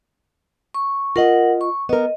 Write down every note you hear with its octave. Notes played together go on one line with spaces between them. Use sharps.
C#6
F4 A#4 D#5 F#5
C#6
B3 A#4 D#5